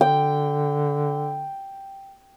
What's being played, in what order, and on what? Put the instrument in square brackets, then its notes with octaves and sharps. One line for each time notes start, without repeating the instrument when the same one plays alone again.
[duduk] D3 [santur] G5